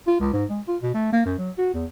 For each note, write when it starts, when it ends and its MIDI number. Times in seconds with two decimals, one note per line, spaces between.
0.07 0.18 65
0.20 0.31 37
0.33 0.45 44
0.50 0.61 56
0.68 0.77 65
0.82 0.93 47
0.94 1.10 57
1.13 1.23 58
1.25 1.37 42
1.38 1.51 54
1.58 1.73 66
1.74 1.85 40